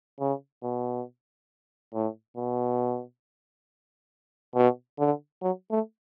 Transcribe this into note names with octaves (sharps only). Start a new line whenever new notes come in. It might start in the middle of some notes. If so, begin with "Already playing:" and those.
C#3
B2
A2
B2
B2
D3
F#3
A3